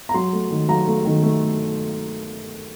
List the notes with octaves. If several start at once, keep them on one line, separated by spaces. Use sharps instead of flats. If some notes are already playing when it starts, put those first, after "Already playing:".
A#5
F#3 C6
A3
D#3
F#3 A#5
A3
D#3
A3